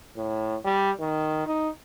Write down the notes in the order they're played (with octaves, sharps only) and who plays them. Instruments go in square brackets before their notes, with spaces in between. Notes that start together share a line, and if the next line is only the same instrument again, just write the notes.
[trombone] A2
G3
D#3
D#4